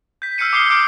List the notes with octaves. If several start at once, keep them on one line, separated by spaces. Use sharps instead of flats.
G6 B6
E6 F6 G6 C7 C#7 D#7
D6 D#6 G6 C7 C#7 G7
D6 D#6 F6 G6 D7